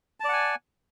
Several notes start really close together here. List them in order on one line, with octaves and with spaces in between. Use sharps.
A5 D5 F#5 G#5